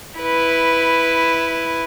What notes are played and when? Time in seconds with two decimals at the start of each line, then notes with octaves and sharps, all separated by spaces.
0.20 E4 B4